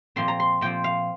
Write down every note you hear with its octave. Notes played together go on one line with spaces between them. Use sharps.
A#2 F3 C4 C6
A#5
C6
A#2 F3 C4 G5
F5